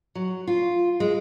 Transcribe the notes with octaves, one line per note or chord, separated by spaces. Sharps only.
F#3
F4
G#3